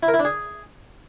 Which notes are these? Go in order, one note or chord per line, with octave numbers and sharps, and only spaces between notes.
E4
A#4
E4
D4
G#4